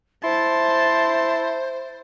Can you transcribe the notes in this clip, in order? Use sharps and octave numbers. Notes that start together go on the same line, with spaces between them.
E4 C5 A5 C6